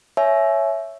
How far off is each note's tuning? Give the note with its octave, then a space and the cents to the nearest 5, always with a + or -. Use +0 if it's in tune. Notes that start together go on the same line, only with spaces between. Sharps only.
C#5 +0 E5 +5 G#5 +30